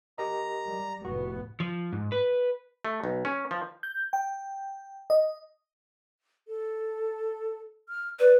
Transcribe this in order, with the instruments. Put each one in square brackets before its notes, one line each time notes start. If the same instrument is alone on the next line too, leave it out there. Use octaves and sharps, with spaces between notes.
[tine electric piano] G4 A#4 D#5 [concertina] A#5
[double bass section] G3
[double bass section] F1 A2 B3 [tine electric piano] F#4
[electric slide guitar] F3
G#2
B4
[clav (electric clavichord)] A3
B1
C#4
F3
[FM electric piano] G6
G5
D#5
[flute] A4
F6
[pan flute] B4 [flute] D5